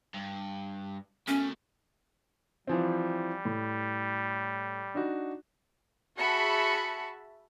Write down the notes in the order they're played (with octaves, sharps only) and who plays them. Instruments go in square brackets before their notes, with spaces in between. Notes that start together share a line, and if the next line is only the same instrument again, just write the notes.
[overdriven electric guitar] G2
[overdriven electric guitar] B2 A3 [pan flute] C#4
[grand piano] E3 F3 C4 [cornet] G3
[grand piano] A2
D4 D#4 F#4
[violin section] F#4 G#4 E5 A5 B5 C#7